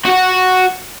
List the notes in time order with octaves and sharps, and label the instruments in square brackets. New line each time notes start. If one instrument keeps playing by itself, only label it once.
[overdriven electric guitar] F#4 F#5